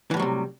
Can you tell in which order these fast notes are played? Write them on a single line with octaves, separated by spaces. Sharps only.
E3 A2 G3 F#3 C3